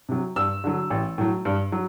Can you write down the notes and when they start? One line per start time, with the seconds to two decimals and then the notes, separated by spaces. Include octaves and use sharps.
0.09 C3 F#3
0.36 G2 E6
0.64 D3 F#3
0.90 A1
1.18 A2 F#3
1.45 G2
1.72 F#3